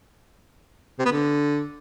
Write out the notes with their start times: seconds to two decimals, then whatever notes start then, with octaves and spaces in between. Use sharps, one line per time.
0.99 C3
1.05 B3
1.12 D3